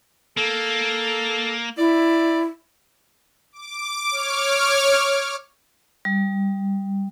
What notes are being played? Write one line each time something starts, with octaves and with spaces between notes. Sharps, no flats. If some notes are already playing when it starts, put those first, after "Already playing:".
A#3 A4
E4 D5
D6
C#5 D6 F6
G3